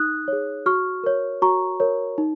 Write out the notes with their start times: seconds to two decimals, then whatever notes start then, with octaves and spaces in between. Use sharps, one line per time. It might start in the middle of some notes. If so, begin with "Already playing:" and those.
Already playing: D#4 D#6 F#6
0.28 G#4 C#5
0.66 F#4 C#6 F6
1.04 A#4 C#5
1.42 F#4 A#5 C#6
1.80 A#4 C#5
2.18 D#4